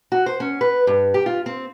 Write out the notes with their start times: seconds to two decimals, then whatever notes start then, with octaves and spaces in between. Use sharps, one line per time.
0.12 F#4
0.26 C5
0.40 C#4
0.61 B4
0.87 G2
1.14 G4
1.26 F4
1.46 C4